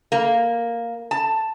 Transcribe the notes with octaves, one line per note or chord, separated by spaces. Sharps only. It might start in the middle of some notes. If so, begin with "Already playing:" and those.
A#3
A5